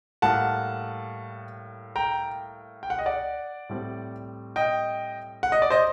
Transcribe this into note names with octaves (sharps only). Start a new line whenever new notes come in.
A2 G3 A#3 F#5 A5
G5 A#5
G5
F#5
D#5
D5 F#5
A2 G3 C4
D#5 G5
F#5
D#5
D5
C5 D#5